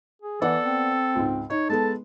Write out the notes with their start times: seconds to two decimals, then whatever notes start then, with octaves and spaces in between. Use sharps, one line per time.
0.22 G#4
0.41 E3 B3 A4 D5 F#5
0.64 C4
1.15 C#2 G#2
1.50 D#4 C#5
1.70 G#3 B3 G#4 A4 A5